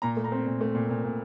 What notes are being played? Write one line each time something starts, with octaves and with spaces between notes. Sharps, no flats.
A#2 A#5
A3
A#5
C4
A#2
A3
A#2
A#2
A#2